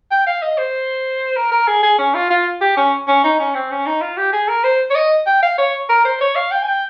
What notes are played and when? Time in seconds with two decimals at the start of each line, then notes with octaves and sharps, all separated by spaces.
0.11 G5
0.27 F5
0.42 D#5
0.58 C5
1.36 A#4
1.52 A#4
1.68 G#4
1.83 G#4
1.98 C#4
2.14 F4
2.30 F4
2.61 G4
2.77 C#4
3.08 C#4
3.24 D#4
3.39 C#4
3.55 C4
3.71 C#4
3.86 D#4
4.01 F4
4.17 G4
4.33 G#4
4.48 A#4
4.64 C5
4.91 C#5
4.96 D#5
5.27 G5
5.43 F5
5.58 C#5
5.89 A#4
6.05 C5
6.21 C#5
6.36 F5
6.52 G5
6.63 G#5
6.68 G5